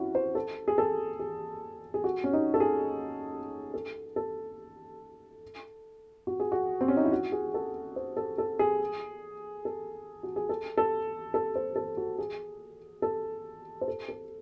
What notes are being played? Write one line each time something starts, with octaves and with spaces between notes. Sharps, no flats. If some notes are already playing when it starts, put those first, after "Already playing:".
Already playing: C#4 E4 F#4
C5
A4
G#4
A4
G#4
G#4
F#4
C#4
D#4
A4
G#4
A4
A4
F#4
G#4
F#4
C4
C#4
D#4
E4
F#4
G#4
A4
C5
A4
A4
G#4
A4
F#4
G#4
A4
A4
A4
C5
A4
F#4
G#4
A4
C5
A4
A4